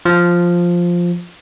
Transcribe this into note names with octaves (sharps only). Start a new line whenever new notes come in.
F3